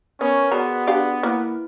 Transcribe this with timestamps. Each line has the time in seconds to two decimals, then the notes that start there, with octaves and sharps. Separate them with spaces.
0.21 B3 C#4 A#4 B4 C#6
0.52 B3 F#4 G#4 D5 A#5
0.87 D4 G4 F5
1.23 A#3 E4 B4